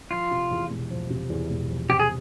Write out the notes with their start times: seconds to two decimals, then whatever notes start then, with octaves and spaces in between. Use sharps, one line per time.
0.11 F3 F4
0.31 C3
0.51 E2
0.70 E1
0.90 F3
1.10 C3
1.30 E2
1.50 E1
1.70 F3
1.89 C3 G4
2.00 G#4